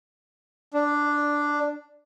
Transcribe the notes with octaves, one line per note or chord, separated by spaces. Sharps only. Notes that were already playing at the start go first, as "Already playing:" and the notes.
D4